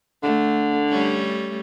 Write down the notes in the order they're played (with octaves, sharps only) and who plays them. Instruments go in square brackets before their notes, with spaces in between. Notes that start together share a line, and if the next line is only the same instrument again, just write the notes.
[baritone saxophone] D3 [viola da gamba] A3
[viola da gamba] G3 A3 C#4